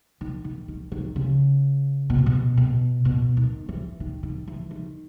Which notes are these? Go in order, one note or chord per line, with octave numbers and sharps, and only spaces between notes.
D#3
D#3
D#3
D#3
C#3
B2
A#2
B2
B2
B2
D#3
E3
D#3
D#3
E3
D#3